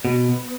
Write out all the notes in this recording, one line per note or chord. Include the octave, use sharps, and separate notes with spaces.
B2 B3